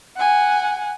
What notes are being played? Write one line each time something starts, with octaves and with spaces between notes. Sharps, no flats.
F#5 G#5